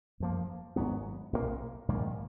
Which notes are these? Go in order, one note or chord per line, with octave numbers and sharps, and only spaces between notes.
F#2 F3 A#3
G#1 G#2 F#3 B3
B1 A#2 F#3 A#3
A#1 G#2 D#3 A#3